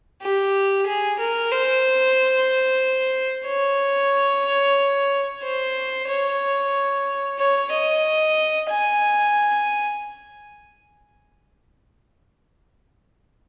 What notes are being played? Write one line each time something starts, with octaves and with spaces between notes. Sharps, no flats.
G4
G#4
A#4
C5
C#5
C5
C#5
C#5
D#5
G#5